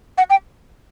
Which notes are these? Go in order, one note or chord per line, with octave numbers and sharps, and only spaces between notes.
F#5
G5